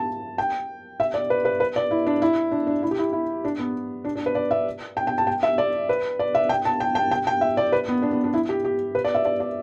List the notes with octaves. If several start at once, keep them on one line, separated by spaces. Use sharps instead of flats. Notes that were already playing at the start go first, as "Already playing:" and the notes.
Already playing: A5
G5
E5
D5
B4
B4
B4
D5
E4
D4
E4
D4
D4
E4
G4
E4
E4
D4
B3
D4
D4
B4
D5
E5
G5
G5
A5
G5
E5
D5
B4
D5
E5
G5
A5
G5
G5
G5
G5
E5
D5
B4
B3
D4
B3
D4
E4
G4
G4
B4
D5
E5
D5
D5